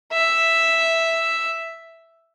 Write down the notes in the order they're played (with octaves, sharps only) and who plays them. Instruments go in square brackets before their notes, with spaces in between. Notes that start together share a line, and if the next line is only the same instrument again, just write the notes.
[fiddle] E5